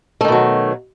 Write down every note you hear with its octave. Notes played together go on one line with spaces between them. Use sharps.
B2 D#3 F#3 A3